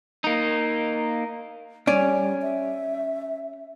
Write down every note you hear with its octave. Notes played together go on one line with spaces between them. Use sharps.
A#3 D#4
G3 C#4 D5
E5